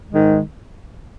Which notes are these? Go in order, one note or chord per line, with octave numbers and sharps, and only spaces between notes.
G#2 D#3 G#3